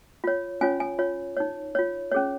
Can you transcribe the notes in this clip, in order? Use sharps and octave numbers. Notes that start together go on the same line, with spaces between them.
F4 C#5
C#4 F4 C#5 G#5
G#5
F4 C#5
D#4 C#5
F4 C#5
C#4 G#4 C#5